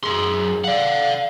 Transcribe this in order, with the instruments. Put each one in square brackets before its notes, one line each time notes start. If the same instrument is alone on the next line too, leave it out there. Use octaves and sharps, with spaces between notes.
[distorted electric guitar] F#2 C6 [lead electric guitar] G#4 A#4
[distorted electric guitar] D5 F#5 [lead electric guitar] F5